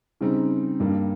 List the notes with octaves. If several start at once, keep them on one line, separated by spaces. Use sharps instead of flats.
C#3 G3 C4 D#4
G2 G3 A#3